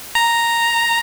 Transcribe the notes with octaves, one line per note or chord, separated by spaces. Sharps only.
A#5